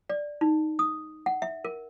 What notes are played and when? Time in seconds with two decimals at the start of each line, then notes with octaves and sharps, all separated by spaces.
0.10 D5
0.41 D#4
0.79 D#6
1.26 F#5
1.42 E5
1.65 A#4